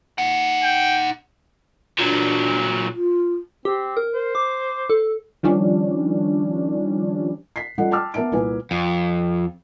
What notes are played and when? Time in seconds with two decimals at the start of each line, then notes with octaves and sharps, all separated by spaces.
0.18 D#4 F#5
0.63 G5
1.99 A#2 F#3 D4
2.94 F4
3.65 C4 G4
3.97 A#4
4.14 C5
4.35 D6
4.90 A4
5.43 D#3 F3 G3 C#4 D4
7.56 B6 C7
7.78 G3 C#4 F4 A4 D#5 F#5
7.91 G5 A5 D6 E6 F6
8.14 B3 A#4 E5 A5 D7
8.32 C2 A#2 B4 G#5
8.71 F2